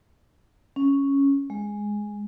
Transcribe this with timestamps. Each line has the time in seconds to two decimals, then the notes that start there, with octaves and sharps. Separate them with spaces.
0.76 C#4
1.50 G#3